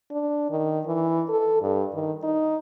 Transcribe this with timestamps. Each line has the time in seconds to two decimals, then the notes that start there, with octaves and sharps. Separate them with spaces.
0.11 D4
0.50 D#3
0.86 E3
1.29 A4
1.62 G2
1.94 D#3
2.23 D#4